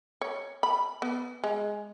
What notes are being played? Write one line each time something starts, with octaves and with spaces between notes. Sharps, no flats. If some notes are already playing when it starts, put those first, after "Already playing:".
C#5
B5
B3
G#3